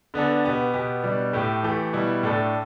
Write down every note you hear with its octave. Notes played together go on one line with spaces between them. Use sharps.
D3 B3 D4 A4
B2 B3 G4
B2 B3 G4
B2 G3 D4
A2 A3 G4
E3 A3 G4
B2 G3 E4
A2 A3 D4 A4